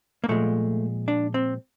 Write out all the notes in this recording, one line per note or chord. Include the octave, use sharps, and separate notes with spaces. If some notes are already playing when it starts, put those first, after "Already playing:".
A#3
A#2 F3 G#3 A3
D4
C4